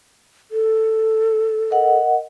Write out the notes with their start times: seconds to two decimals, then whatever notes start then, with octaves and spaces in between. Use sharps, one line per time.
0.51 A4
1.70 A#4 D#5 F#5